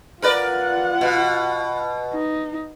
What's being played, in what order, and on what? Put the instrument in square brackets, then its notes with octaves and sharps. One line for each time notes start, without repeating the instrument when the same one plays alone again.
[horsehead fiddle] F4 F#5 [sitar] A#4 B4 D5
[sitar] B2
[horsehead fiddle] D#4